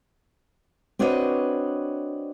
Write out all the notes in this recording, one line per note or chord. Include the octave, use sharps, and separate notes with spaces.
C4 D4 F#4 B4 C#5 D#5